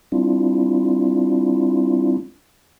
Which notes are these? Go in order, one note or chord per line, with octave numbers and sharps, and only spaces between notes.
G3 C4 D4 E4 F4